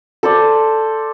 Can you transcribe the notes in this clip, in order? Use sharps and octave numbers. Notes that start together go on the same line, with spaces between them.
A4 C5 D5